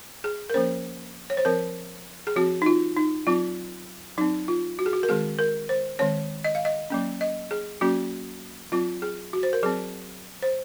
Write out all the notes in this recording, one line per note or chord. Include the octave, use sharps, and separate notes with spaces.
G#4
A#4
F3 A#3 C#4 C5
C#5
C5
F3 C4 A#4
G#4
F3 C4 F#4
D#4
F4
D#4
F#3 C4 F4
F#3 C4 D#4
F4
F#4
G#4
F#4
A#4
D#3 G#3 C4 G#4
A#4
C5
D#3 G#3 C4 C#5
D#5
F5
D#5
F#3 A#3 C#4
D#5
G#4
F#3 A#3 C#4 F#4
F#3 C4 F4
G#4
F#4
C5
A#4
F#3 C4 G#4
C5